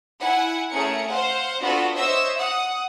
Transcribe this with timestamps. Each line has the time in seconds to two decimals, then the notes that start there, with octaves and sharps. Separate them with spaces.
0.20 E4 F#5 G#5
0.70 A3 C#4 G#4 A#4 C#7
1.07 C5 F5 F#5
1.61 B3 D4 F4 F#4 A4
1.94 C5 C#5 D#5 E5 E6
2.37 F#5 D#6